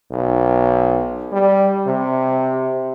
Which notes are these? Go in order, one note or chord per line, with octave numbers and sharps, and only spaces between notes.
B1
G3
C3